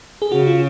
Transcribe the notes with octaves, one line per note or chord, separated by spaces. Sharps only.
G#4
C#3 F#4
F4